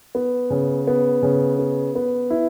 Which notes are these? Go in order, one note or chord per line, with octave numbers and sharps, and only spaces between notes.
B3
C#3
B3
C#3
B3
B3
E4